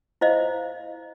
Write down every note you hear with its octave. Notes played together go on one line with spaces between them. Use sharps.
E4 C5 D#5 F5